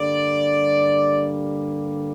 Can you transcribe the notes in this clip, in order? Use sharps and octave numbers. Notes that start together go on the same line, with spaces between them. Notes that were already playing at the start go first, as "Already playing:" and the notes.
Already playing: G2 D3 G3 A#3 D5